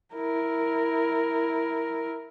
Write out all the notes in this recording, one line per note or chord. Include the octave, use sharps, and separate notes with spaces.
E4 A#4